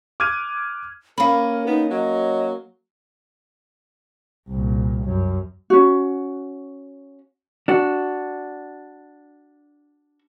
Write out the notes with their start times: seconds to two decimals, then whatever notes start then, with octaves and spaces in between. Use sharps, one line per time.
0.20 D6 F6 F#6 G#6 D#7
1.18 A#3 C#4 A#4 F5 B5
1.67 B3 D#4
1.91 F#3 D#5
4.49 C2 A#2
5.04 F#2
5.70 C#4 F#4
7.68 D4 F#4